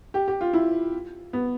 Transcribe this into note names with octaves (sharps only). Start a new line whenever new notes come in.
G4
G4
F4
E4
B3